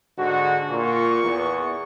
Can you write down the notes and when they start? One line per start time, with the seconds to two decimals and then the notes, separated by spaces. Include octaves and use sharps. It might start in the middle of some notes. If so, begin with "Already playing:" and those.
0.18 G#2 D3 F#4
0.71 A#2 C#6
1.24 E2